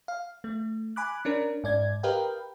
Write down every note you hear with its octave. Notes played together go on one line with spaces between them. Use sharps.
F5
A3
G#5 B5 D6 F#6
C#4 D4 A#4
G#2 D5 G#6
G4 A#4 B4 D#5 F5 G5